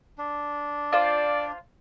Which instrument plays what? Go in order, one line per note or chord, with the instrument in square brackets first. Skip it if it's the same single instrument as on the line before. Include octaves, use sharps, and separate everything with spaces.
[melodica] D4
[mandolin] F4 C5 [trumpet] D5